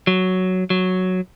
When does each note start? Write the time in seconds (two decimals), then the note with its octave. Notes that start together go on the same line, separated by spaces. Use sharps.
0.07 F#3
0.70 F#3